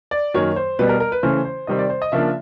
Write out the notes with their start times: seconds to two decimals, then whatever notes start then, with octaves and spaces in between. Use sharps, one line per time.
0.11 D5
0.34 F#2 D#3 F#3 A#3 C#5
0.56 C5
0.79 B2 G3 B3 B4
0.89 A#4
1.00 A#4
1.12 B4
1.23 C#3 E3 A3 C#4 C5
1.45 C5
1.67 C3 D#3 G3 C4 D#5
1.79 D5
1.90 C5
2.02 D#5
2.12 C#3 F3 A#3 D4 E5